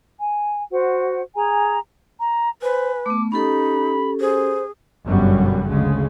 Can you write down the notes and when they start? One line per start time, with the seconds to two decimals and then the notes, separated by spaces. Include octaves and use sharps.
0.20 G#5
0.71 F#4 C5 F#5
1.35 G#4 G#5 A#5
2.20 A#5
2.62 B4 C5 G#5
3.06 A3 B3 D6
3.32 C#4 D#4 G4 A4 B5
4.20 G#4 C5
5.05 G1 F#2 B2 F#3 G3
5.68 D2 C#3 G#3